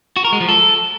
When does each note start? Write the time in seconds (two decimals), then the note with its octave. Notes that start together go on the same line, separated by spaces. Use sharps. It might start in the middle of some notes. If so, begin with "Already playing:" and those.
0.16 F#4
0.24 A#4
0.33 G#3
0.41 F3
0.49 A4